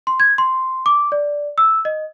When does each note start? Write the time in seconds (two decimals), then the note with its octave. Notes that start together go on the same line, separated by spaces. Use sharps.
0.07 C6
0.20 G#6
0.38 C6
0.86 D6
1.12 D5
1.58 E6
1.85 D#5